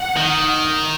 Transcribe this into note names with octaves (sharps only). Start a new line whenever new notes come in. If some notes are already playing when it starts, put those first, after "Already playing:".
Already playing: F#5
D#3